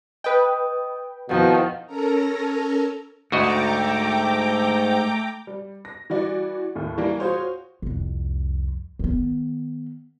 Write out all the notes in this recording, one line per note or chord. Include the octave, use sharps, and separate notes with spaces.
B4 D#5 G5 D#6
F2 B2 D#3 F3 E4 F5 F#5
C#4 A4 A#4 A#5
D2 G#2 A3 F#4 D#5 G5 A#5 D6
G3
A#6
E3 G3 F#4 D5
D#2 A2
E3 G3 A#3
F4 F#4 G#4 C5 C#5
C2 F2
D#3 B3